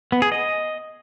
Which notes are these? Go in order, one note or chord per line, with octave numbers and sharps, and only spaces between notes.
B3
G#4
D#5